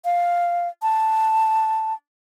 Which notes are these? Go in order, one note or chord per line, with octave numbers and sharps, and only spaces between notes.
F5
A5